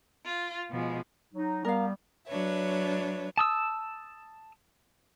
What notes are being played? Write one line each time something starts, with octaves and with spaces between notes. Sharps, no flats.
F4
B2 F3 G#3
F#3 D#4
G3 B3 A#4 F5
F#3 D4 B4 C#5 E5
A5 D#6 E6